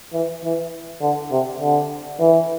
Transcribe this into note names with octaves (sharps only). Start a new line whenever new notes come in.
E3
E3
D3
C3
D3
E3